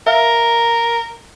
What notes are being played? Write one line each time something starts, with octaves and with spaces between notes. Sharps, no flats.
A#4 E5 F5